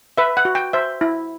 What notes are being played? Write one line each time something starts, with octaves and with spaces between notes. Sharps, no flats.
B4 E5
F#5
F#4
G5
C5 E5
E4